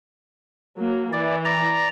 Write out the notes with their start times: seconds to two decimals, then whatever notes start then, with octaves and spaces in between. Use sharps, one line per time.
0.78 F#3 A#3
1.13 E3 D5
1.45 D5 A#5